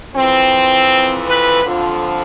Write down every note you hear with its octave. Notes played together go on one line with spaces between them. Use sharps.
F2 E3 C4
B4
F2 D3 F3